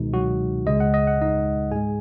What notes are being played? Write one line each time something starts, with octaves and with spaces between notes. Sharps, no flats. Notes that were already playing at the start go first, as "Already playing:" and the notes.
Already playing: C#2 B2 D#3 G#3 D#4
F#3 F#4
C#2 C#3 G#3 D#5
F#5
D#5
F#5
D#4 D#5
G#2 G#3 G#4 G#5